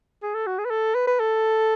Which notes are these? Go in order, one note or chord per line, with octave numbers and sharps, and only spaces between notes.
G#4
A4
F#4
G#4
B4
A4
B4
B4
A4